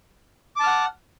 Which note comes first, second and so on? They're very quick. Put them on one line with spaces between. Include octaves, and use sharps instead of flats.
D6 A5 F6 F#5